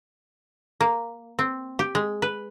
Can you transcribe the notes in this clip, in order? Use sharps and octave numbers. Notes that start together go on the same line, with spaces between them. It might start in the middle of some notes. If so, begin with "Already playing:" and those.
A#3
C4
G4
G#3
B4